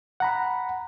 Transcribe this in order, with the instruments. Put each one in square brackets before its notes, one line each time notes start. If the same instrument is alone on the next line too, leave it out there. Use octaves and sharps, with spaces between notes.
[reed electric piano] F#5 A#5 B5